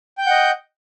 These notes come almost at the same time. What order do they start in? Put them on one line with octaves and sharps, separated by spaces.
G5 G6 F#5 D#5